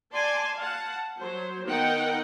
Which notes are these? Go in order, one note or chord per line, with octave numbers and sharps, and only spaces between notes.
D5 G#5 A5 C6
F5 F#5 A5
F#3 C5
D#3 B3 D#4 F#5 G5